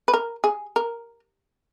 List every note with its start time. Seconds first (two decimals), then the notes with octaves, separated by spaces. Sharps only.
0.08 B4
0.14 A#4
0.44 G#4
0.76 A#4